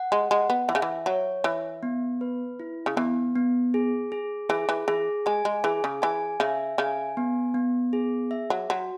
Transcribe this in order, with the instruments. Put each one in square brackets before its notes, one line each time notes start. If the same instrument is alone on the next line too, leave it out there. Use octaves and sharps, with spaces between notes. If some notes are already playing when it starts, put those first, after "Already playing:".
Already playing: [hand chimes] F#5
[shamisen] G#3
[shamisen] G#3 [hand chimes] F#5
[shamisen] B3
[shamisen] E3 [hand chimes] E5
[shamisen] C#3
E3
[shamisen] F#3 [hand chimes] C#5
[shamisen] E3 [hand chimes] E5
[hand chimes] B3
B4
E4
[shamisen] C#3
[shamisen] E3 [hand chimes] B3
[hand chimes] B3
G#4
G#4
[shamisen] E3 [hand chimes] G#4
[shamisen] E3
[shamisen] E3 [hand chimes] G#4
[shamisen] G#3 [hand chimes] G#5
[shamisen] G#3
[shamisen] E3 [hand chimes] G#4
[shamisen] C#3
[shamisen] E3 [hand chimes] G#5
[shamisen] C#3 [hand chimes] E5
[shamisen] C#3 [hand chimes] G#5
[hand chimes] B3
B3
G#4
E5
[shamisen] F#3
[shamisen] F#3 [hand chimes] F#4